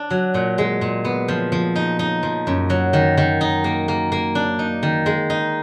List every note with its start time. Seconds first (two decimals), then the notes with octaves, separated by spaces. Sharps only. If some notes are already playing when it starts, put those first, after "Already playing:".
Already playing: D4
0.11 F#3
0.34 A#2
0.58 G#3
0.81 A#2
1.05 B3
1.28 F3
1.52 F3
1.76 D#4
1.99 D#4
2.23 F3
2.47 F#2
2.70 F#3
2.93 D#3
3.17 D#3
3.41 D#4
3.64 A#3
3.88 A#3
4.12 A#3
4.35 D4
4.59 D#4
4.83 D#3
5.06 G#3
5.30 D#4